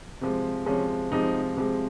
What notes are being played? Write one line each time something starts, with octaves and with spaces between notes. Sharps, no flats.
C3 F3 G#3
C3 F3 G#3 C#4
C3 F3 G#3 D#4
C3 F3 G#3